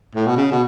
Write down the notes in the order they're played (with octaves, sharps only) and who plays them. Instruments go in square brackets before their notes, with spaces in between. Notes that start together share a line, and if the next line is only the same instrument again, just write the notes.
[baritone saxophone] A2
B2
C#3
B2